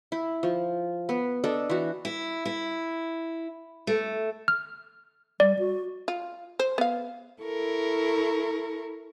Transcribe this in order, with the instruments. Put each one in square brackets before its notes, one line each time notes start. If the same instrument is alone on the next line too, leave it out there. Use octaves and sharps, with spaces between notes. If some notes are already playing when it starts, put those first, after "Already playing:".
[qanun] E4
F3
B3
D4 A4 D#5
E3 F#4
[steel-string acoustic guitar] E4
E4
A3
[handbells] F6
[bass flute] G3 [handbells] D5
[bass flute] F#4
[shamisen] F4
C5
B3 F5
[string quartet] E4 A4 A#4 C#6